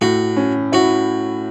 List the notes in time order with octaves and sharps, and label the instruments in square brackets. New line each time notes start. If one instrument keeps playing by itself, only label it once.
[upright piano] A2 [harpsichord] F#4
[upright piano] C#4
[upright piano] E4 [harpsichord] F#4